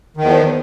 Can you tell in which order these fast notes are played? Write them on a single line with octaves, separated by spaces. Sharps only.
D#3 E2 F3